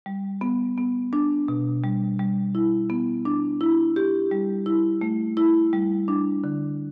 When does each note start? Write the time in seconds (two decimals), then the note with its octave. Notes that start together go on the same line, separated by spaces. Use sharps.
0.06 G3
0.41 B3
0.78 B3
1.13 D4
1.48 B2
1.84 G3
2.19 G3
2.55 E4
2.90 B3
3.25 D4
3.61 E4
3.96 G4
4.31 G3
4.66 E4
5.01 A3
5.37 E4
5.73 G3
6.08 D4
6.44 D3